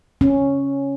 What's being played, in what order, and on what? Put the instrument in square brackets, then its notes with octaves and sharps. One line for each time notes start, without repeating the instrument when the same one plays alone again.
[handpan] C#4